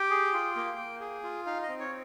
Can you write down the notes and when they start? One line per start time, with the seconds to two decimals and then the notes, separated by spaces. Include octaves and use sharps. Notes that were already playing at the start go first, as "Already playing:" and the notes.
Already playing: G4 G5
0.10 G#4
0.33 F4
0.56 A#3
0.78 A#3
1.00 G#4
1.23 F4
1.46 D#4 F5
1.62 D#5
1.69 C4
1.79 C#5